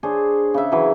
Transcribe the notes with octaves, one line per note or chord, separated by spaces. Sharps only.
D4 G#4 C5 C#5
C#3 E5
E3 F#3